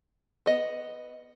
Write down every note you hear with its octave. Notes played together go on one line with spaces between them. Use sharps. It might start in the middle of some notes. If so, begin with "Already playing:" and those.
B3 D#5